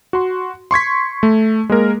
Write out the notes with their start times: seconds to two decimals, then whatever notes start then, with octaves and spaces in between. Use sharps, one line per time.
0.13 F#4 C6
0.71 C6 C#6 G#6 B6
1.23 A3
1.69 G#3 A#3 A#4